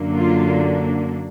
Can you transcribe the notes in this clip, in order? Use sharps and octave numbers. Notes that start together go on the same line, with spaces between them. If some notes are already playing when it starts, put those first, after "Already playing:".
Already playing: F#2 D3 F#3 A#3 D4
F4